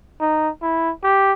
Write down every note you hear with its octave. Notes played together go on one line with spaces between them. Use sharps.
D#4
E4
G4